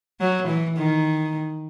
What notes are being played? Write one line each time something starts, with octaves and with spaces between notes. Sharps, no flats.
F#3
E3
D#3